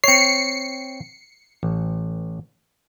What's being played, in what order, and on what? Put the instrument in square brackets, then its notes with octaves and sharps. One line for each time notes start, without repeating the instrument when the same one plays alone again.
[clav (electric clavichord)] C4 C#5 [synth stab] C7 C#7
[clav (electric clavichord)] A1